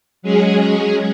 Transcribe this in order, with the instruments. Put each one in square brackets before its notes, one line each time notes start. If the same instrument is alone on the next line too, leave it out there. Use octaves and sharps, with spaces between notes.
[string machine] F#3 G#3 C#4 G#4